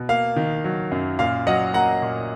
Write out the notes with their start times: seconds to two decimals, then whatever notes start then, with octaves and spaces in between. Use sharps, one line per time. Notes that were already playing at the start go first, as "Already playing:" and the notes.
Already playing: B2
0.09 A#3 F5
0.36 D#3
0.64 F#3
0.92 F#2
1.19 A#2 F5
1.47 F#3 D#5 F#5
1.74 A#3 F#5 A#5
2.02 A#2